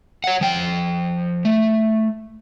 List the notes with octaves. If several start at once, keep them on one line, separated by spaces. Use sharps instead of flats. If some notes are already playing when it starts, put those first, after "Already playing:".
C#5 F#5
F3 G5
A3